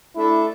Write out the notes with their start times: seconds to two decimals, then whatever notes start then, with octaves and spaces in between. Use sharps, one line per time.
0.16 A3 D4 E4 A4 E5